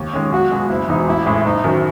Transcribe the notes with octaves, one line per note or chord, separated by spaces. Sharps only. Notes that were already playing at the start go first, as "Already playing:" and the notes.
Already playing: D#2
D#3 G#3 C#4
B1 F#4
B2 G#3
F#1 E4
E2 B2 G#3 D#4
A1 E4
A2 G#3
F#1 D#4
F#2 D#3